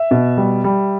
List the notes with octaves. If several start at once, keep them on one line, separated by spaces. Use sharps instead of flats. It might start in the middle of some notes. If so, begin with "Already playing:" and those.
Already playing: E5
B2
G3
G3